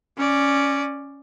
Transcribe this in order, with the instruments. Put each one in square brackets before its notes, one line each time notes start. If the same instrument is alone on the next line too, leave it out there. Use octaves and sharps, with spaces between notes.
[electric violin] C#4 D5